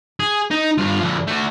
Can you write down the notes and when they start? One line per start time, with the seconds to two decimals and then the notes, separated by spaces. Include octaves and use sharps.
0.20 G#4
0.51 D#4
0.78 G2 F4
1.02 F2 D3
1.27 A3 F#4